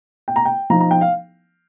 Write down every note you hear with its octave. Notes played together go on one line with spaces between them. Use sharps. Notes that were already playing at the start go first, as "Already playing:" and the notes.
G5
A#5
G5
F3 D#4 A#5
A#5
G5
F5